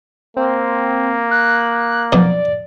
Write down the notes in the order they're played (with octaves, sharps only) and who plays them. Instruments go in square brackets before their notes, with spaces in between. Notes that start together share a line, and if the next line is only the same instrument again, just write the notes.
[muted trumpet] A#3 [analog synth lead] C4
[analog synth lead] F#6
[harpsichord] B1 F2 B2 [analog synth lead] D5